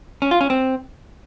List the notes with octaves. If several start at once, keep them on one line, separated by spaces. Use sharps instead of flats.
C#4
F4
C#4
C4